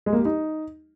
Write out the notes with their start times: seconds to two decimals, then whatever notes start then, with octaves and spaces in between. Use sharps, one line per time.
0.06 G#3
0.13 A#3
0.19 G4
0.25 D#4